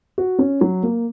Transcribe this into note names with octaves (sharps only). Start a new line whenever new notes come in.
F#4
C#4
F#3
A#3